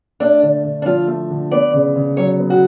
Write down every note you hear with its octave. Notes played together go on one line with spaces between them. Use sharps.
A3 D4
D3
D3
D4
F3 F4
A3
D3
B3 D5
C#3
C#3
F#3 C#5
B3
F#4